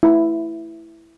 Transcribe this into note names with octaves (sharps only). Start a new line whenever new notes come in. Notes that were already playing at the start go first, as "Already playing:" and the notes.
E4